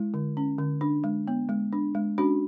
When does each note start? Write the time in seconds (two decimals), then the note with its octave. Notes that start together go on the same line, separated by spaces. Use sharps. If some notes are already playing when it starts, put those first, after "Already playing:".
Already playing: G#3 E4
0.14 D3
0.37 C#4
0.58 D3
0.81 D4
1.04 G#3
1.28 B3
1.49 G#3
1.73 D4
1.95 G#3
2.18 C#4 D4 F#4